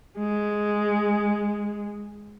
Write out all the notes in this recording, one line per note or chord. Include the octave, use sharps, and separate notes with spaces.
G#3